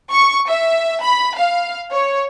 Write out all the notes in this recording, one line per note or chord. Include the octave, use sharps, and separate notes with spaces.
C#6
E5
B5
F5
C#5